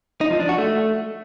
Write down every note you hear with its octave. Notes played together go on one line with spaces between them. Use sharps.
D#4
F3
D4
F#4
A3